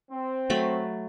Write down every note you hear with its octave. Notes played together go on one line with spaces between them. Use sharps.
C4
F#3 A3 B5